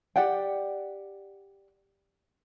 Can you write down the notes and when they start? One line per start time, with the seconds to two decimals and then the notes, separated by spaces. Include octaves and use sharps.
0.16 G4 D5 F#5 G5